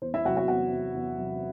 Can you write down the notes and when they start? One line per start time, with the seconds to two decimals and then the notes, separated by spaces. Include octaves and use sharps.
0.02 E2 C5
0.14 E4 E5
0.25 C3 F#4 F#5
0.29 F#3
0.37 F#4 F#5
0.48 E2 F#4 F#5
0.71 C3 F#3
0.95 E2
1.18 C3 F#3